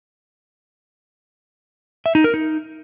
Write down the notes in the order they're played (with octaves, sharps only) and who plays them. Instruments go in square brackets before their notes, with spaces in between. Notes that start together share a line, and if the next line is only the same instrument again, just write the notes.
[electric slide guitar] E5
D#4
A#4
D#4